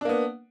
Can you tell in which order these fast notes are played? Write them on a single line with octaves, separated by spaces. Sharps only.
D4 A#3 B3